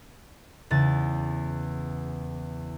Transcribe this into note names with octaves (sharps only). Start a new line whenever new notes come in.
E2 C#3 A6